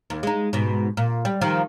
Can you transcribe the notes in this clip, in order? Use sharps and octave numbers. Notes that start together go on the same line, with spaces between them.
D#2
G#3 D#4
G#2 B2
A#2
G3
D#3 F3